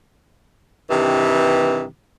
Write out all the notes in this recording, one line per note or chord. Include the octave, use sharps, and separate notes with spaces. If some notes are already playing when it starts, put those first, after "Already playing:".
G2 C3 D#3 E3